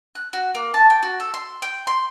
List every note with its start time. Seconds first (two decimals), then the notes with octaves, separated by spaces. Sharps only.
0.15 F#6
0.33 F#4
0.55 A#3
0.74 A5
0.90 G5
1.03 F#4
1.20 A4
1.34 C6
1.62 G5
1.87 C6